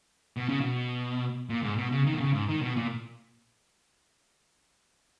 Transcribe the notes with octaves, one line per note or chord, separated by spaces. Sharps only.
B2
C#3
B2
A#2
G#2
B2
C#3
D#3
B2
C#3
G#2
D#3
B2
A#2